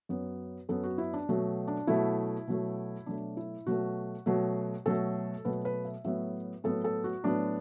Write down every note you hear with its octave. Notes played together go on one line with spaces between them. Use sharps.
F#2 F#3 B3
F#2 F#3 B3 A4
F#4
E4
D4
B2 F#3 A3
D4
B2 F#3 A3 E4
B2 F#3 A3
B2 F#3 A3 D4
E4
B2 F#3 A3 F#4
B2 F#3 A3
B2 F#3 A3 A4
B2 F#3 A3 B4
B4
E5
A2 F#3 B3 E5
A2 F#3 B3 A4
A4
F#4
A2 F#3 B3 D4